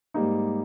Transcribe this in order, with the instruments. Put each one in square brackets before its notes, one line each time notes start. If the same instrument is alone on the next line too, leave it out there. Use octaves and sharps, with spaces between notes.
[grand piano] G#2 G3 A#3 D#4